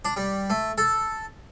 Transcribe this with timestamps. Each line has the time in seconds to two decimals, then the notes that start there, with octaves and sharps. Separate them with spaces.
0.05 D4
0.17 G3
0.50 A3
0.78 A4